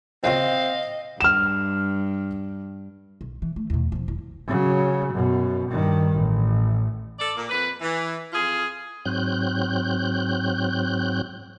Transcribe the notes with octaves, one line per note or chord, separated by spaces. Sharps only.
D#2 C#3 C4 F4 D#5 F5
G2 F6 E7
B1
E3
A3
E2 B2
F3 B3
E1 E4
C#3 F#3
F#2 B2
G2 D#3
A1
A4 D5
A#2
F2 B4
E3
F2 F4 G#4
G#2 F#3 C4 F#6 G6